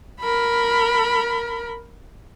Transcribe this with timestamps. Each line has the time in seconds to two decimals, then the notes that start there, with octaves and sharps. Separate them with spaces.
0.21 A#4 B5